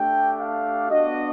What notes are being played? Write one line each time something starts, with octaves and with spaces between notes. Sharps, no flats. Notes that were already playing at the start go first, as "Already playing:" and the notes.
Already playing: A3 D4 G4 G5
F5
B3 D4 F#4 D#5